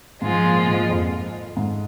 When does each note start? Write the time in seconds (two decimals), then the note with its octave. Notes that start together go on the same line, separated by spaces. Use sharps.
0.22 G#2 F3 G#3 F4
0.44 A#2
0.67 G#2
0.90 F2
1.57 G#2